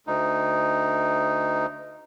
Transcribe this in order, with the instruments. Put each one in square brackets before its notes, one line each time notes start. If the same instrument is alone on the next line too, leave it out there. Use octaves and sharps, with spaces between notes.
[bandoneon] D2 D#4